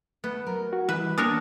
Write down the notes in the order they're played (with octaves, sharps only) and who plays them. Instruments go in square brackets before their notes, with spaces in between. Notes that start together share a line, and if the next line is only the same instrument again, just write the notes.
[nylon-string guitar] A3 [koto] B3
[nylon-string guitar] F#3 A#4
[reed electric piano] F#4
[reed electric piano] E3 [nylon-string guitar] G3 D#5 [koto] B4
[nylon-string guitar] A#3 B3 D5 [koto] D4 A#4 C#5 [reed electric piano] D#6